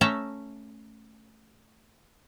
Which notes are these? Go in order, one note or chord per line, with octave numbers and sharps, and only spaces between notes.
A3 C#4 A4 E5 A5 A#5